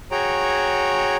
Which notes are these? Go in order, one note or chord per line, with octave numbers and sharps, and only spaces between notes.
F#4 G#4 C#5 G5 A#5